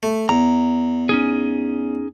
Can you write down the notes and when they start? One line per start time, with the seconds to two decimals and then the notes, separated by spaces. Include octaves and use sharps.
0.03 A3
0.29 E2 A#5
1.09 C#4 D#4 G#4